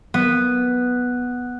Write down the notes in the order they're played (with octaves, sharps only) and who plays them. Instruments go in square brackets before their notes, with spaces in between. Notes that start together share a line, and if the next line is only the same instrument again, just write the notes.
[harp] B3